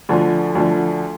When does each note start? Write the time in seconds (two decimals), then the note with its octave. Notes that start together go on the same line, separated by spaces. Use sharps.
0.09 D2 D3 F3
0.55 D2 D3 F3